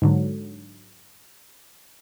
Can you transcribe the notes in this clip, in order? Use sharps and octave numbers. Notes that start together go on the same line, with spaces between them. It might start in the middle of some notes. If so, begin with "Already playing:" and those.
G#2 D3 F#3